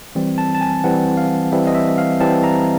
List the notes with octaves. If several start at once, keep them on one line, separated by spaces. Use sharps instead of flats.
E3 G3 C4
A5
A5
G#5
E3 G3 C4 F#5
F5
E3 G3 C4 E5
D#5
E5
F5
E3 G3 C4 A5
A#5